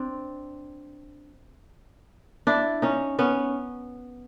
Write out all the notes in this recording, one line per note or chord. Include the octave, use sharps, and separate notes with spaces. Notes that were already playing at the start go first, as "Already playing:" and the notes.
Already playing: C4 D4
D4 E4
C#4 D#4
B3 C#4